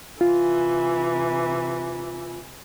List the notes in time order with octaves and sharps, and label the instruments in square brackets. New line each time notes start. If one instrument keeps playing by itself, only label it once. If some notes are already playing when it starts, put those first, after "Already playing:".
[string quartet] C3 E3 G#5 [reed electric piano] F4